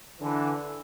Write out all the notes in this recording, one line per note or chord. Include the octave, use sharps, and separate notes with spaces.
D3 E3